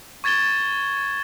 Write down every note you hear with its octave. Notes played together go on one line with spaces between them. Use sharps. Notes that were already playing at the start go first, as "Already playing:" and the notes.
C#6 G#6 A6 E7 G7